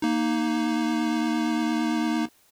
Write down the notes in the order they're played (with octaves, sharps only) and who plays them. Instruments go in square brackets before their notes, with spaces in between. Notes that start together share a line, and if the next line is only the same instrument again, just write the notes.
[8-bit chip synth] A#3 D#4